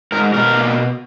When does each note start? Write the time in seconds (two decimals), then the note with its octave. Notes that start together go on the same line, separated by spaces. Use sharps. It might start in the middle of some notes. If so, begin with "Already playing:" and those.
0.12 G#2 A#4
0.34 B2 A#4
0.56 A#3